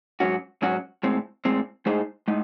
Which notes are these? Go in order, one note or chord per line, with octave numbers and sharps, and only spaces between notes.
G#2 F#3 C#4 F#4
G#2 F#3 C#4 F#4
A2 G#3 C4
A2 G#3 C4
A2 G#3 D#4 G#4 C5
A2 G#3 D#4